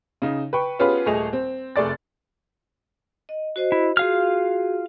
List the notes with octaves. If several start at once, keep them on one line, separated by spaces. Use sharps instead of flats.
C#3 D#4
B4 G5 C#6
B3 C#4 F4 G4 G#4 B4
D#1 A3 G#4 D#5 F7
C4
F1 A3 G#4 D5 D6 A6
D#5
F#4 C5 D#5
E4
F4 F#4 G#4 F5 F6